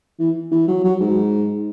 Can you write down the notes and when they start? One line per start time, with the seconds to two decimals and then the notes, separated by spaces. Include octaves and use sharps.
0.19 E3
0.51 E3
0.68 F#3
0.84 F#3
1.01 G#2